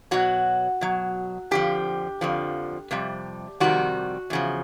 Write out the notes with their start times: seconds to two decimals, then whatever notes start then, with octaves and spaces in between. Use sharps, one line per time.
0.11 B2 F#3 F#4
0.81 B2 F#3
1.51 F2 D3 F3 G4
2.21 F2 D3 F3
2.91 F2 C3 G3
3.60 F2 C3 D#3 G3 F#4
4.30 E2 C#3 F3